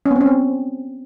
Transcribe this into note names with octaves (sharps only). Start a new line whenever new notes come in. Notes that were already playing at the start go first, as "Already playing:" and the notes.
C#4
B3
C4
C#4
C4